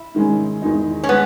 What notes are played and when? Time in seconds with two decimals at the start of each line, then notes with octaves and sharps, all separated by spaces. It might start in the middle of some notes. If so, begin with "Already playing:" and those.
Already playing: E4
0.14 G#2 D#3 G#3 C#4
0.62 E2 D#3 G#3 D#4
1.03 C#4
1.09 G#3 B3